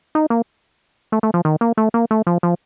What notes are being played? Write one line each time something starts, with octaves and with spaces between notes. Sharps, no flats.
D#4
A#3
A3
A3
F3
D#3
A#3
A3
A#3
A3
F3
F3